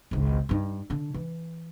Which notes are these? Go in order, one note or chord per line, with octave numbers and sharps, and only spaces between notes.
G#1 C#2
G2 D#4
D3 D4
E3